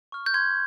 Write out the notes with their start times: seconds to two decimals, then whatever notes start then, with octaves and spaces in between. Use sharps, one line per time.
0.12 C#6 F6
0.26 G6
0.34 C6 G#6